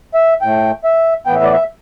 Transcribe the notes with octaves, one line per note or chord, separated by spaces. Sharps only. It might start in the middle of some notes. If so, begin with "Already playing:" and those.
E5
A2 A3 G5
E5
A2 E3 B3 G5
E5
D5
E5